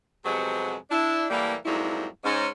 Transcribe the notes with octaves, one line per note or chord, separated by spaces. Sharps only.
F2 C3 F#3 G#3 B3 C5
D4 E4
A2 E3 G3 A3 A#3
F2 G#2 F#3 G3 A#3 E4
G#2 C#4